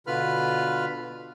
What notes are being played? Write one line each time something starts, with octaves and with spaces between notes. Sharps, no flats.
B2 D3 F4 B4 B5 F6